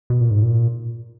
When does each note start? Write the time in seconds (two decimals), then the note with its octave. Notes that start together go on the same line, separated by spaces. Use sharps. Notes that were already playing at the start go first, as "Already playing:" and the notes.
0.10 B2
0.21 A#2
0.31 G#2
0.42 A#2